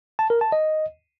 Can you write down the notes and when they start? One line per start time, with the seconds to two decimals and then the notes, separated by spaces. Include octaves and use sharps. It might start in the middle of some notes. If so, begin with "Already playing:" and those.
0.19 A5
0.30 A#4
0.41 A5
0.52 D#5